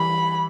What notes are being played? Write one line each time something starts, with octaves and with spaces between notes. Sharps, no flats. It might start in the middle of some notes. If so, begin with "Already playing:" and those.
Already playing: E3 G3 B5